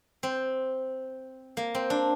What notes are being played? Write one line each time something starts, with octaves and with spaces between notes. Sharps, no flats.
C4
A#3
C4
D4